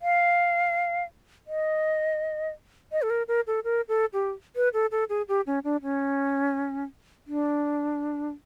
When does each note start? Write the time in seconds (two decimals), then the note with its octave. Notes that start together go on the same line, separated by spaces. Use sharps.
0.02 F5
1.47 D#5
2.92 D#5
3.02 A4
3.10 A#4
3.28 A#4
3.47 A4
3.64 A#4
3.89 A4
4.13 G4
4.56 B4
4.74 A4
4.92 A4
5.09 G#4
5.28 G4
5.47 C#4
5.64 D4
5.83 C#4
7.27 D4